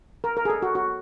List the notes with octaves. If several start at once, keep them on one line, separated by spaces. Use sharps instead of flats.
A#4
A#4
G#4
A4
F#4
F#4